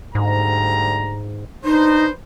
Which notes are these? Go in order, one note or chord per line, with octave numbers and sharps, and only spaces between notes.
D2 G#2 G3 A#5
D4 D#4 B4 C5